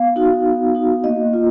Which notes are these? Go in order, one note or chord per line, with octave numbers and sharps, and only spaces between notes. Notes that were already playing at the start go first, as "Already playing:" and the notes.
Already playing: B3 F5
D#4 F#4
B3
D#4 F#4
A#3 D#5
F4